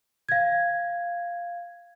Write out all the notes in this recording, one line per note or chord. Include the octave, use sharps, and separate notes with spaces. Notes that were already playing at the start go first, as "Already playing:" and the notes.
F5 G#6